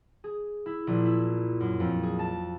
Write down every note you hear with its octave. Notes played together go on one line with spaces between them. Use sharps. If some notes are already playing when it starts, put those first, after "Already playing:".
G#4
E4
A#1
E4
F#2
F2
G#4
A5